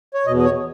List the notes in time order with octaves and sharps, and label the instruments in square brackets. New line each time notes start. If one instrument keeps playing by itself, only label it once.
[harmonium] C#5
E2 B2 D#5
D#5
C#5